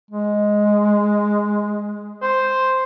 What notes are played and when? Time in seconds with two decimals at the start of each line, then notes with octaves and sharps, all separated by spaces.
0.11 G#3
2.22 C5